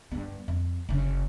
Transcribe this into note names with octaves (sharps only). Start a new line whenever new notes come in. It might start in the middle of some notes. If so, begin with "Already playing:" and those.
G2 B3
F2
F#1 C#3